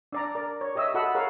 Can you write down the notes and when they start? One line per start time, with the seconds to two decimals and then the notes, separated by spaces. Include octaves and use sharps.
0.13 D4 D5 A#5
0.35 A#4 D5
0.61 C#5
0.75 G4 C#5 D#5 E5 E6
0.94 F#4 A4 D#5 F#5 B5 E6
1.15 G#4 A#4 C#5 F5 F#5